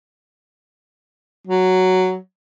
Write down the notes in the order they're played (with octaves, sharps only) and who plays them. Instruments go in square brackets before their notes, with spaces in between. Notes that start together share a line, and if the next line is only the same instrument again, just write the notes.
[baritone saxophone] F#3